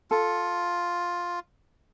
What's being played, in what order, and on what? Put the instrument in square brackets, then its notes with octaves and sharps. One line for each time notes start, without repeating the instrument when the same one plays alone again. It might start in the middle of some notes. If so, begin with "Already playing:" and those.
[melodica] F4 [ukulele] A4